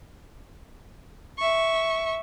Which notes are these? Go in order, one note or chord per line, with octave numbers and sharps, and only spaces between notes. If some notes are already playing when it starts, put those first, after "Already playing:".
E5 C#6